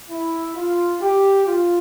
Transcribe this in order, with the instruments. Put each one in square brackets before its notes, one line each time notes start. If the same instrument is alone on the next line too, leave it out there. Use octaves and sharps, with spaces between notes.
[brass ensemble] E4
F4
G4
F4